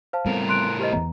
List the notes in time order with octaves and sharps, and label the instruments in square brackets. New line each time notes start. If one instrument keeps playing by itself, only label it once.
[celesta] C5 F5 A5
[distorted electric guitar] A2 A#4 [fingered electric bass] G3 B3 C4
[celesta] C6 F#6 D7
G4 C5 D#5
[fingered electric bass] E2 E3 B3 [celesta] A#5